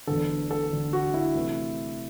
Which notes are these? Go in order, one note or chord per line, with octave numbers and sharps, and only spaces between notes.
E1 D2 D3 A4
A4
E1 D2 D3
F#4
E4
C3 E3 A3